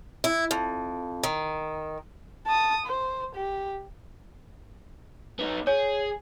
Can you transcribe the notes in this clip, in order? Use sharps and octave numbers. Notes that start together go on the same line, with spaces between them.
E4
F2
D#3
A5 D#6
C5
G4
B3 D#4
G#4 C#5